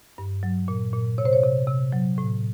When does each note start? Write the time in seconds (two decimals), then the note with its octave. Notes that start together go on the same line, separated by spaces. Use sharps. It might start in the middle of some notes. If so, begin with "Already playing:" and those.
0.18 G2
0.43 F#3
0.68 A#2
0.93 A#2
1.18 C3 C#5
1.25 C5
1.33 C#5
1.43 C3
1.68 C3
1.92 F#3
2.18 A2